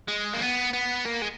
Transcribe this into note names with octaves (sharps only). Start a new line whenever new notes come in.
G#3
A#3
B3
B3
A#3
G#3